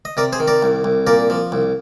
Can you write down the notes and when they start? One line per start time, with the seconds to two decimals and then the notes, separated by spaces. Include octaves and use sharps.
0.05 D#5
0.17 C3 A#4 D5
0.33 G#4 C5
0.40 D#3
0.48 A#4 D5
0.63 C2
0.84 C2
1.07 A#2 A#4 D5
1.30 F3
1.52 C2